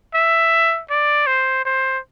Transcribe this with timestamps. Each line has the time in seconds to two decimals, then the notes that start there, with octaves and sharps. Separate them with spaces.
0.14 E5
0.90 D5
1.26 C5
1.65 C5